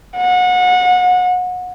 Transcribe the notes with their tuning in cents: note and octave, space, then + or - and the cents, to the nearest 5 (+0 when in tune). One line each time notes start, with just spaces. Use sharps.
F#5 -30